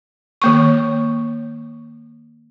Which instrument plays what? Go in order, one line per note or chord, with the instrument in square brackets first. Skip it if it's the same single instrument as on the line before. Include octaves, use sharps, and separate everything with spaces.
[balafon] D#3 A#3 C#6